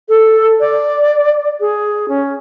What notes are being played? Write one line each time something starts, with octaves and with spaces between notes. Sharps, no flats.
A4
D5
G#4
C#4